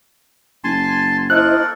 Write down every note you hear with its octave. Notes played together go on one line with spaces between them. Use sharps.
F#1 G#5 A5 C6
A#3 E4 A4 A#4 C5 D#5 F#6